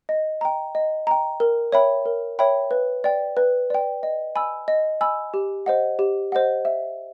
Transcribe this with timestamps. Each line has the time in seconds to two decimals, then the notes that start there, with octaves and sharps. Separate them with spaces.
0.09 D#5
0.41 G5 A#5
0.75 D#5
1.07 G5 A#5
1.40 A#4
1.72 C#5 E5 G5 B5
2.06 A#4
2.39 C#5 E5 G5 B5
2.71 B4
3.04 D5 G5
3.37 B4
3.70 D5 G5
4.03 D#5
4.36 G#5 B5 E6
4.68 D#5
5.01 G#5 B5 E6
5.34 G4
5.66 C5 D#5 F#5
5.99 G4
6.32 C5 D#5 F#5
6.65 E5